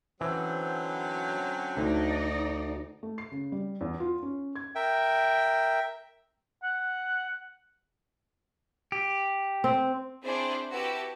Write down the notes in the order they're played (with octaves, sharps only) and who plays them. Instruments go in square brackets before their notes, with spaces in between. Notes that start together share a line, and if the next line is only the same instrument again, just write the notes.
[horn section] D3 F#3 [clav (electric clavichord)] E3 [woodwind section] C4 C#4 C5
[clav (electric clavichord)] D2 [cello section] D#4 D5
[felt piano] A3
C7
C#3
G3
E2
F4
C#4
G#6
[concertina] A#4 E5 G5
[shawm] F#5
[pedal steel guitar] G4
[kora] C4
[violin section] C4 D4 E4 G#4 C5 D5
E4 F#4 G4 B4 A5 E6